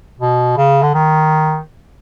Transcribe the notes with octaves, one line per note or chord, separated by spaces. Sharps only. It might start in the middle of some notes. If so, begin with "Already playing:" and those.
B2
C#3
D3
D#3